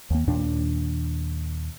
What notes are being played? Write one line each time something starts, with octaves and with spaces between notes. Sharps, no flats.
D#2 A#3
D#2 A#2 D4